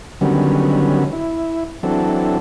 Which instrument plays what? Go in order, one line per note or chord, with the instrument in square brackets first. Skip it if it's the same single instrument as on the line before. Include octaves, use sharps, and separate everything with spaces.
[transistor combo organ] D3 D#3 F#3 G3 B3 C#4
E4
E3 F#3 C4 D4 A4